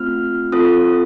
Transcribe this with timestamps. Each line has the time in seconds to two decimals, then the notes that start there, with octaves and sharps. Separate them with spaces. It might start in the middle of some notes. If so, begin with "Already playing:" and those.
Already playing: A3 C4 F4 F6
0.52 C4 F4 A4 D#6